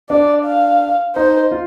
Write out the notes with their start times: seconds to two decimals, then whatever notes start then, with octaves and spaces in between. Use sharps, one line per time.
0.09 D4 D5
0.45 F5
1.16 D#4 C5
1.52 F4